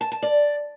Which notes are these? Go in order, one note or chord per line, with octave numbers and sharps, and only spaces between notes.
A5
A5
D5